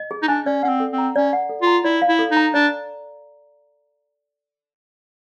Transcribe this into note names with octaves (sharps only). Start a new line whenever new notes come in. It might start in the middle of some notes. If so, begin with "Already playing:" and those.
Already playing: D#5
G#4
D#4
D4 G#5
C#4 D5
C#4 F#5
C4
A4
C4
A#5
C#4 D5
F#5
A4
F4
A#5
E4 D5
F5
E4
A4
D#4
A#5
D4 D5